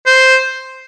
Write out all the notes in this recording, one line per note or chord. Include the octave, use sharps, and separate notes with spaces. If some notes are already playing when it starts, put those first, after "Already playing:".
C5